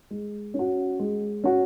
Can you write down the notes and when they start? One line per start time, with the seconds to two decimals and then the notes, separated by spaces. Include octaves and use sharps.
0.11 G#3
0.54 C#4
0.59 F#4
0.99 G#3
1.44 C#4 F#4